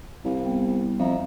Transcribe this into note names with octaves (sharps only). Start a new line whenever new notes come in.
C2 F5
G3 B3 G5
F2 E5 F5 A#5